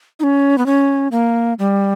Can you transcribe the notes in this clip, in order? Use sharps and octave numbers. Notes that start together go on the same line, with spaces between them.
D#4
C#4
B3
C#4
A#3
G3